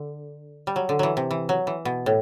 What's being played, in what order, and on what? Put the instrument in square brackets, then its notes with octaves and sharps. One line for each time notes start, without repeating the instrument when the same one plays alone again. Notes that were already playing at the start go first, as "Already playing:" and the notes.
Already playing: [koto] D3
G3
F#3
D3
E3 F#3
C3
E3
F#3
E3
B2
A2